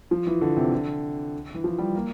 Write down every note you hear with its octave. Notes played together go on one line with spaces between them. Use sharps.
F3
E3
D3
C3
D3
E3
F3
G3
A#3